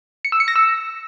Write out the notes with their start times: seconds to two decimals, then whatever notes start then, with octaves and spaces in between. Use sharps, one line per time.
0.25 C#7
0.32 E6
0.40 C#7
0.48 A#6
0.56 E6